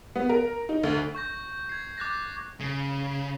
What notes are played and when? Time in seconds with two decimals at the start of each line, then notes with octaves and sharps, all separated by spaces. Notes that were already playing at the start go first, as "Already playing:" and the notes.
0.16 B3
0.29 A#4
0.69 D#4
0.83 D2
1.15 C#6 G6 A#6
1.69 G#6 C7
1.98 D6 F#6 A6 A#6
2.60 C#3